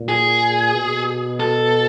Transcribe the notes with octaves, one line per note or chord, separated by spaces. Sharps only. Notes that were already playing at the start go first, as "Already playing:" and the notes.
Already playing: A#2
G#4
B2
A4